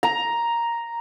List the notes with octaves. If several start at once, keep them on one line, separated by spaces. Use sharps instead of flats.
A#5